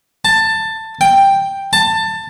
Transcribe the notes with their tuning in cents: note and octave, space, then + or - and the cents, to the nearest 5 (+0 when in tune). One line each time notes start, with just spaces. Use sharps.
A5 +15
G5 +5
A5 +20